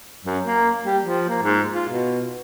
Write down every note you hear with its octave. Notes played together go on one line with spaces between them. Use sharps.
F#2
A#3
G3
F3
A#3
G#2
F4
B2